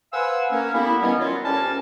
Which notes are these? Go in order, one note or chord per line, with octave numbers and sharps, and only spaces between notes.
B4 C5 F5 F#5 G#5 E6
A#3 C#4
D3 G3 B3 E4
D#3 E3 G3 B3 C#4
F#3 E4 F4
D2 G3 C#4 A#4 G#5 A5